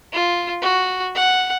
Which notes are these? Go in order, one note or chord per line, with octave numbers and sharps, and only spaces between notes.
F4
F#4
F#5